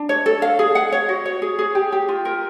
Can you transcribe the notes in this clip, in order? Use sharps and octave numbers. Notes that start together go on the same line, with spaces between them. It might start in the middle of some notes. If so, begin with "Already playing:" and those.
Already playing: D4
C#5
A4
F5
G#4
F#5
C#5
F#4
C#5
G#4
G#4
G4
G4
F4
A#4